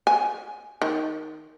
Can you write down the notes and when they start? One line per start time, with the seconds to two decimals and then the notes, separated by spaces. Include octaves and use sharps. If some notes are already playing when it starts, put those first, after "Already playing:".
0.07 G#5
0.82 D#3